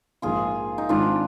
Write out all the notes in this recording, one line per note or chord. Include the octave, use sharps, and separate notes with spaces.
A#1 G#2 F3 A#3 F4 G#4
D#4
G#1 G#2 D#3 G#3 C4 D4 F4